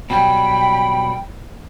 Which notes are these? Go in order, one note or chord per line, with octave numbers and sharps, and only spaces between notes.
B2 F#3 G3 G5 B5